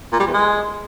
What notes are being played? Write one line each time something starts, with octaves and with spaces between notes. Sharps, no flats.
A#2
G3
E2
G#3